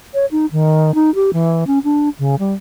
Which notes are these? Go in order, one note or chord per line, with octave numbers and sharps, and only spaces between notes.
C#5
D#4
D#3
D#4
G4
E3
C#4
D4
C#3
G3